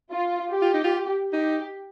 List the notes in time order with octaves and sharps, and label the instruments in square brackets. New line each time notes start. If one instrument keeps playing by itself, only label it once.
[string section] F4
G4
[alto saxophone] F4
D#4
F4
[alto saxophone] D#4 [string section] G4